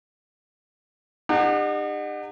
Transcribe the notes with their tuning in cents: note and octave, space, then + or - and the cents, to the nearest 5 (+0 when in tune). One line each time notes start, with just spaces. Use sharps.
D#4 -40 G4 +40 F#5 -10